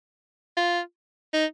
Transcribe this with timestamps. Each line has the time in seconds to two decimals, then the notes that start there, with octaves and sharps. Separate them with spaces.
0.57 F4
1.34 D#4